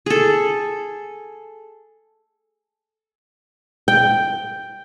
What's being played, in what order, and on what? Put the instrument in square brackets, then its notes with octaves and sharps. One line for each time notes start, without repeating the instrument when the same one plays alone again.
[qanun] G#4 A4
[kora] G5